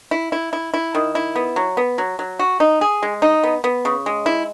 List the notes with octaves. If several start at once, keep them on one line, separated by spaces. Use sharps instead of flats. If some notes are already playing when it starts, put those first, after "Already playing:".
E4
E4
E4
E4
D#3
E4
B3
F#3
B3
F#3
F#3
F#4
D#4
G#4
G#3
D#4
B3
B3
C#3
G#3
E4